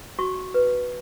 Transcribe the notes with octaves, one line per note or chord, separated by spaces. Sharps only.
F#4 C#6
B4